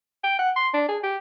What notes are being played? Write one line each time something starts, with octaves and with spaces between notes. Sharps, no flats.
G5
F#5
C6
D4
G#4
G4